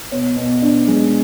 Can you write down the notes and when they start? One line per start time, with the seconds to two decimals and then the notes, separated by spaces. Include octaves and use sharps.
0.11 B2 C#5
0.37 B2
0.62 D4
0.88 G#3